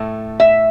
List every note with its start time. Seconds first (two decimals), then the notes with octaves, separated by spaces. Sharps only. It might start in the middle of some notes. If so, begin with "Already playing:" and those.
Already playing: A2 A3
0.40 E5